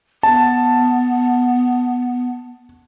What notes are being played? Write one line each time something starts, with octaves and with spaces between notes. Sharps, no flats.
B3 A5